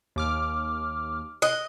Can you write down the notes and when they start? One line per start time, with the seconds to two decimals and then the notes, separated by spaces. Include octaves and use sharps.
0.16 D#2 D6 F6
1.42 D#5 F#6